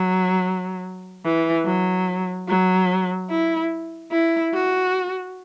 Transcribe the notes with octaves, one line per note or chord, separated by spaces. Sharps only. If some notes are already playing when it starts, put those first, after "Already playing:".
Already playing: F#3
E3
F#3
F#3
E4
E4
F#4